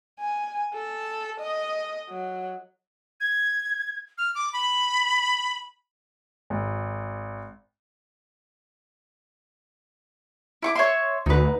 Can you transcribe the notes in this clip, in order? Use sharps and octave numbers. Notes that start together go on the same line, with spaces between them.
G#5
A4
D#5
F#3
G#6
F6
D6
B5
G#1
E4 C#6 D6
C#5 E5 C6
D2 D#4 B4